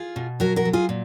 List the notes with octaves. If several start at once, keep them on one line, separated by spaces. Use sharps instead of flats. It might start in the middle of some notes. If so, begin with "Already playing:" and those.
Already playing: F4 G#4
B2
F#3 F#4 A#4
F#4 A#4
F#3
F4 G#4
A#2